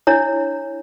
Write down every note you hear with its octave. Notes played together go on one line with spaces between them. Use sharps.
D4 E4 C#5